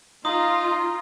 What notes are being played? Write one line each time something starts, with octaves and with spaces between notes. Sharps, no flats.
D#4 F4 D#5 C6 D#6